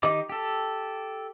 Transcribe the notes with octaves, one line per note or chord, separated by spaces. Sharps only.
D#3 D#4 G4 D#5 D6
G4 A4